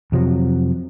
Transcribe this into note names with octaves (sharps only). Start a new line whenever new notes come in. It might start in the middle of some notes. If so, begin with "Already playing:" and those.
F2 C3 F3 F#3